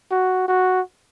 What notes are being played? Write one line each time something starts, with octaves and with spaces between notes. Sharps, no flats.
F#4
F#4